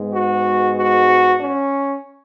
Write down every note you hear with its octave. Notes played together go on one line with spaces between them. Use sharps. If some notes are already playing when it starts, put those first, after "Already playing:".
Already playing: G#2 G#3 B3
F#4
F#4
C#4